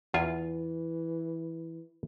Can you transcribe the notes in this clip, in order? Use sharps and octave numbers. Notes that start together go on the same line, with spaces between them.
E2 E3 F4 G#5